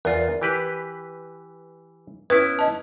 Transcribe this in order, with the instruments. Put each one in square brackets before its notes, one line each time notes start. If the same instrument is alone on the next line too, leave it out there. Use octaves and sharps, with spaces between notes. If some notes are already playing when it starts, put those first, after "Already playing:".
[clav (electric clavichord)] E2 F4 [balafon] A#4 D5
[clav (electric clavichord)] E3 G4 B4
[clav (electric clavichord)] B3 C#4 E4 [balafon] B4
[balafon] D#5 A5